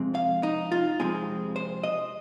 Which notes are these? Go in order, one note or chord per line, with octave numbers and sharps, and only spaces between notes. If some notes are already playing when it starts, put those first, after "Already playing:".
Already playing: F2 C3 G#3 C4
F5
D#4
F4
F2 C3 G#3 C4 G#4
C5
D#5